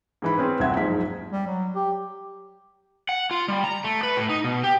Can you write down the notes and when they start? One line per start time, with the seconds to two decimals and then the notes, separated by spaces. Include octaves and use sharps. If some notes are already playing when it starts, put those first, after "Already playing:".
0.22 G#2 E3 B5
0.37 C4 C#4 G#4 B4
0.59 D#1 C2 C4 E5 F#5 G#6
0.76 F#1 G#2 F3 B6
1.32 G3
1.47 F#3
1.76 G4
3.09 F#5
3.31 F4
3.48 G3
3.64 A#5
3.84 A3
4.03 B4
4.17 A2
4.29 D#4
4.44 B2
4.64 G4